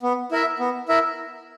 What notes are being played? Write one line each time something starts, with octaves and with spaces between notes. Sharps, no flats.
B3
E4 A#4 E5
B3
E4 A#4 E5